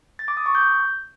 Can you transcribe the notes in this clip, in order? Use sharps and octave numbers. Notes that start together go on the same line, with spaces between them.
A6
D6
D#6
C#6
G6